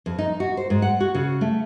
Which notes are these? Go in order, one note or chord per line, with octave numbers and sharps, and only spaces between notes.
F2
D#4
F#4
C5
G#2
F#5
F#4
C#3
A3